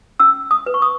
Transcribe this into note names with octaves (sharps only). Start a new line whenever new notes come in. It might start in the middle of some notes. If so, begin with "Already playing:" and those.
C#4 E6
D#6
B4
C#6
D#6